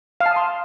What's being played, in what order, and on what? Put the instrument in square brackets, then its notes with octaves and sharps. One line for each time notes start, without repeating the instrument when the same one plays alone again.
[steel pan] F5
A5
D#6
C6